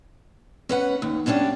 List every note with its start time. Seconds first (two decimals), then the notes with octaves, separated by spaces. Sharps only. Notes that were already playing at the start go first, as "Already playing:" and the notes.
0.69 C#4 B4 F#5
1.02 D#2
1.26 F#2 B2 C#4 D4 G4